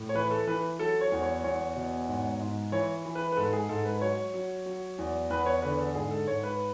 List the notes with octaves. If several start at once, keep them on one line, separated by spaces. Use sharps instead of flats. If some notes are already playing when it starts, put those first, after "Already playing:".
Already playing: A2
C#5
E3 B4
A4
E3 B4
F#3 A4
C#5
E2
C#5
E2 C#5
B2
G#2
G#2
E3 C#5
E3
B4
B4
G#2 A4
G#4
G#2 A4
B4
F#3 C#5
F#3
F#3
E2
E2 B4
C#5
D3 B4
A4
G#2 G#4
A4
G#2 C#5
B4